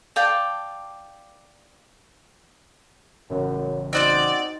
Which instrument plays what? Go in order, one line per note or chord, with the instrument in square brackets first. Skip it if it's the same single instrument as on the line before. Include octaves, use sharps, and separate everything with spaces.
[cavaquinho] D5 F5 G5 A5
[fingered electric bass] A1 C#3 [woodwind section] F#2
[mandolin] C4 F#4 G6 [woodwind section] D#4 [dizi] D5